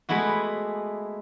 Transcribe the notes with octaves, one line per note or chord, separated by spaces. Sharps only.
G#3 A3 B3 E4 F#4